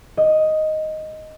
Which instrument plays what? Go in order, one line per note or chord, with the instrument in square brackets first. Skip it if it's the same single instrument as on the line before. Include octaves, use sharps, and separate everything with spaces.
[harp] D#5